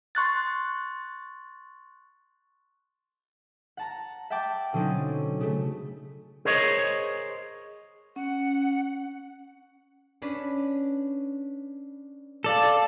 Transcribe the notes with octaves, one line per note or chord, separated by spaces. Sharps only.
C6 C#6 F#6 A6
F#5 A5 A#5
E5 F#5 G5 A5 D6
B2 D3 F#3 C4 C#4 D#4
C#3 A3
G#4 A#4 C5 C#5 D#5
C#4 F#5
C#4 D4 B4
A4 D5 F5 A5